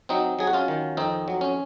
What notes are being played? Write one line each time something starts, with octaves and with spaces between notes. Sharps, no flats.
F#3 C4 D#4
F#3 G#4
F#4
C#4 F4
D#3
F2 C4 D#4
F#3
C#4